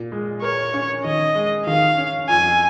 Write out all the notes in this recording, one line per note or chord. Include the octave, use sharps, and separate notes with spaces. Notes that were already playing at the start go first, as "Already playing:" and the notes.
Already playing: A#2
G#3
A#4 C#5
C#4
D#3 D#5
G#3
D#3 F5
C#4
F2 G#5